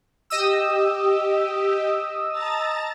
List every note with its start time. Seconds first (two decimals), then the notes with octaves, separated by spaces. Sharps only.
0.30 G4 D#5 D#6 E6
2.32 A5 A#5 A6